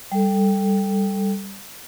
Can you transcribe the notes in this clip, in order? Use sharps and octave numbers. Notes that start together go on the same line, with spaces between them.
G3 A4